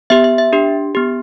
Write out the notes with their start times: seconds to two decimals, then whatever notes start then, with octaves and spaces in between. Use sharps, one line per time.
0.10 B3 G4 E5
0.24 E5
0.38 E5
0.53 D4 G4
0.95 B3 G4